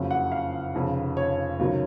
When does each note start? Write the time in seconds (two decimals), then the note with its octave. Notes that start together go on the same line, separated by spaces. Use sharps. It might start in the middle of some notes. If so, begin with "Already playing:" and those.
Already playing: F#1 F2 C#3 F#3
0.11 F#5
0.32 F5
0.74 F1 F2 C#3
1.17 C#5
1.59 C#2 C3 D#3 F#3